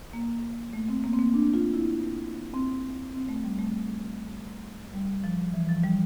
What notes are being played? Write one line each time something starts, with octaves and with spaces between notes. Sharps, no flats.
A#3
A3
C4
A#3
C4
A#3
D4
F4
E4
C4
C4
A3
G3
A3
G3
F3
E3
F3
G3